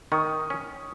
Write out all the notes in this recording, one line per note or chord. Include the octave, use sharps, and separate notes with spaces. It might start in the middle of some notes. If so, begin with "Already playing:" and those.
D#3 C#6 D#6
C#4